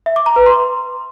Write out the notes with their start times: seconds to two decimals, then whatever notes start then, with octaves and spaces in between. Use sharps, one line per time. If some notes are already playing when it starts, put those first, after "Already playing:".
0.06 E5
0.16 D6
0.26 A#5
0.36 B4
0.46 C6